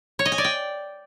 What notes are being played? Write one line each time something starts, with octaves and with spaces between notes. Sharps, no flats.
C#5
D#5
G#5
D5
G5